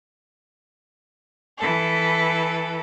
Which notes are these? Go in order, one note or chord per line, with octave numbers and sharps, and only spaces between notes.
E3 A4